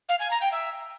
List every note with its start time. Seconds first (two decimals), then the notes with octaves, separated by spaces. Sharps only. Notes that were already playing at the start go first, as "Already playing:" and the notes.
0.08 F5
0.19 G#5
0.30 A#5
0.41 G5
0.51 E5